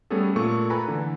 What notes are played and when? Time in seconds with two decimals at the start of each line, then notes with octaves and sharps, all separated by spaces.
0.10 G3 A3 B3 C#4 G#4 A4
0.36 A#2 A3 C#6
0.70 A4 B4 G#5 A#5 B5
0.88 D3 E3